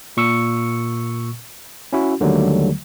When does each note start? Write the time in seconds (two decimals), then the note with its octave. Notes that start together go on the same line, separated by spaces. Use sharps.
0.17 A#2 C#6 E6 C#7
1.93 C#4 E4 F#4
2.20 D#2 D3 D#3 F#3 G3 A3